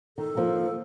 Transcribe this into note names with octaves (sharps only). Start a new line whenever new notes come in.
D#3 A4
D#3 F3 A#3